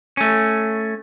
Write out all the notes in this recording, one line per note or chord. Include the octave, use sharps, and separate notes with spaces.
A3 C#4